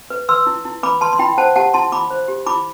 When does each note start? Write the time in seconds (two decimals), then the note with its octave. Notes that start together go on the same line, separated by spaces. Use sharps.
0.10 B4
0.29 B4 C6 E6
0.46 E4
0.65 E4
0.83 B4 B5 D6
1.01 B4 A5 C6
1.13 C6
1.19 E4 G5 B5
1.38 C5 F#5 A5
1.56 G4 F#5 A5
1.74 E4 A5 C6
1.92 E4 B5 D6
2.10 C5
2.28 G4
2.46 E4 B5 D6